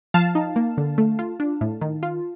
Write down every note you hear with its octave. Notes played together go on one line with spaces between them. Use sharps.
F3 F5 A5
D#4
A#3
D3
A3
F4
D4
A2
D#3
F4